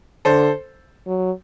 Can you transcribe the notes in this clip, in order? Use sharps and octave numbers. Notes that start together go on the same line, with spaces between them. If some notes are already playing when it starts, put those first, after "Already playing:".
D3 A4 C5
F#3